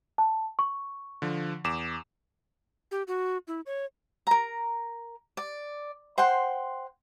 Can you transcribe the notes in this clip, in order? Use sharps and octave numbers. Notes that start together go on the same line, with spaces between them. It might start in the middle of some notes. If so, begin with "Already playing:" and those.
A5
C#6
D3 F3
E2 D6 E7
G4
F#4
E4
C#5
A#4 A#5
D5
C5 F#5 G5 C6